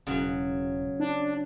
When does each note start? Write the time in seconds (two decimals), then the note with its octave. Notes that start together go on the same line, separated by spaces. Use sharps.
0.07 E1 C#3 F#3
1.00 D4